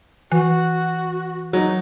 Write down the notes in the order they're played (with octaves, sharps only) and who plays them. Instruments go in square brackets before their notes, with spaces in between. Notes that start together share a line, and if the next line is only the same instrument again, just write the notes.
[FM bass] E3 [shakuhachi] F#4
[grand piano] F#3 [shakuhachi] D#4